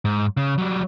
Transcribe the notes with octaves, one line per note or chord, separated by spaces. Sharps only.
G#2
C#3
F#3 G3